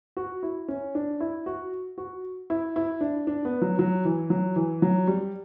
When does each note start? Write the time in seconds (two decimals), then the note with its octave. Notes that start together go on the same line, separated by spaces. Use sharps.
0.17 F#4
0.43 E4
0.68 C#4
0.95 D4
1.20 E4
1.46 F#4
1.98 F#4
2.50 E4
2.76 E4
3.01 D4
3.27 D4
3.45 B3
3.62 F#3
3.79 F#3
4.05 E3
4.30 F#3
4.56 E3
4.82 F#3
5.07 G3